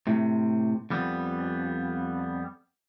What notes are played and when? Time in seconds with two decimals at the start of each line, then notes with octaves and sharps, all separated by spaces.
0.07 A2 C3
0.90 F2 G3 B3